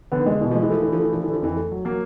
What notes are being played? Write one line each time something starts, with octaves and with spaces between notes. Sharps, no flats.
D3 B3
D#3
D3 G#3
B2 E3
F3 G#3
E3
F3 A3
D3 E3
F3
E3 A3
D3 F3
D3 E3
F3
F2 E3
A3
F#3
F#3 A#3